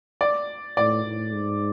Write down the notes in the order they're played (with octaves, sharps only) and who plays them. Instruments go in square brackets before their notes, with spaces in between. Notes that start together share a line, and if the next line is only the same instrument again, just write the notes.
[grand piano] D5
[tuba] A2 [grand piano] D5
[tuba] A2
G#2